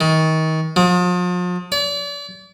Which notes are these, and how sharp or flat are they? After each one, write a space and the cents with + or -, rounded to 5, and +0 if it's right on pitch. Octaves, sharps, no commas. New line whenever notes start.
D#3 +30
F3 +40
D5 -40